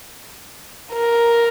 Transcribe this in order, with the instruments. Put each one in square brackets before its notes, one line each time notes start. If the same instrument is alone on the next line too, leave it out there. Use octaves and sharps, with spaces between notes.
[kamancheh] A#4